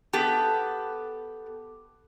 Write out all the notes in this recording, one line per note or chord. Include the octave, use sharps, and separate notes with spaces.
B3 G4 A4